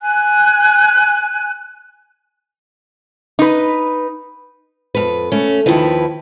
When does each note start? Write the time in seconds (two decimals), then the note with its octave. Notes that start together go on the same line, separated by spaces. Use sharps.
0.01 G#5 F#6
3.39 D#4 B4
4.95 F2 B4
5.32 A3 C#4
5.66 D#2 D#3 F3 E4 B4